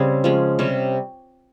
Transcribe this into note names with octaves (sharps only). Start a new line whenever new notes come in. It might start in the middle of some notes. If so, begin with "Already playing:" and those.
Already playing: C#3 G3 C4 G#4
F3 G#3 C#4
C3 G3 C#4